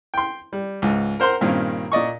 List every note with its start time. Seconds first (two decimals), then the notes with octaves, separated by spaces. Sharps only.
0.14 G5 C6
0.53 G3
0.82 C#2 G#2
1.20 A#4 C5 F#5 C6
1.41 G2 A#2 D#3 A#3 C4 C#4
1.92 A#2 D5 D#5 C#6